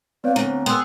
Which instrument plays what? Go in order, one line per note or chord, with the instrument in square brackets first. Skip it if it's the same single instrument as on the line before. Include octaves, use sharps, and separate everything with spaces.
[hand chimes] B3 C4 C#5 [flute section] B4 D5 F5
[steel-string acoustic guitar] D2 [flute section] A#5
[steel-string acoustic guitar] B3 G#4 [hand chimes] G5 E6 [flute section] C6 D#6